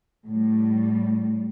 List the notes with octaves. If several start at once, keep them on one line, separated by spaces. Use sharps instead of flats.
A2 G3